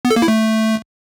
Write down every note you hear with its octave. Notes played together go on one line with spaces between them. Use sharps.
B3
A4
A#3
E4
A3